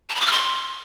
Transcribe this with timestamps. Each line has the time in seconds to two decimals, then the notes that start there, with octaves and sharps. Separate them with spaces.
0.10 A5
0.15 B5
0.21 D6
0.26 F6
0.32 C6